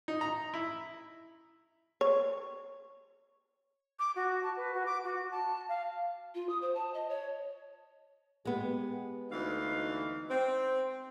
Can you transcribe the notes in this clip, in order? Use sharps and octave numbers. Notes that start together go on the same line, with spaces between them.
D#4
A#5
E4
C#5
D6
F#4
A5
B4
F#4
D6
F#4
A5
F5
F4
D#6
C5
A5
D#5
C#5
G#3 B3 G4
D2 E3 D#4 F5
C4